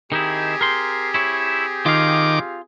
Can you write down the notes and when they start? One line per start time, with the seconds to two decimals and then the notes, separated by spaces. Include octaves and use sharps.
0.12 D#3 C4 D#4 E4 G4 G#4
0.61 A#4 C6
1.14 E4 C#5
1.86 D#3 F4 F5 D6